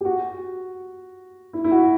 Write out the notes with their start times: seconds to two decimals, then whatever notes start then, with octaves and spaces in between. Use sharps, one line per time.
0.01 G4
0.05 F#4
1.53 E4
1.64 E4
1.71 F#4